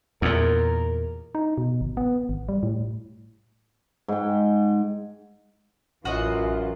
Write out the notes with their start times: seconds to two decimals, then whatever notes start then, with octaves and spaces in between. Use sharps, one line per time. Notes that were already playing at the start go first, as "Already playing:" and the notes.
0.22 E2 A#2 A#4
1.35 D#4
1.58 B2
1.81 G#1
1.97 B3
2.29 G#1
2.49 G3
2.63 A2
4.08 G#2 G5
6.05 A1 F#2 E3 F4 F#4 D#5